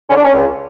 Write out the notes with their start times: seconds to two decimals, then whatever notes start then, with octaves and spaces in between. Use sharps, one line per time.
0.09 D3 C#4
0.16 D4
0.24 C#4
0.34 C#2